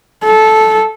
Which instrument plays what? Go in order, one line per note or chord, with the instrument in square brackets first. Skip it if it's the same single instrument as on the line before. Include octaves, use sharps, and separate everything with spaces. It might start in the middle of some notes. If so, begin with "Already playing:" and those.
[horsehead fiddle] A4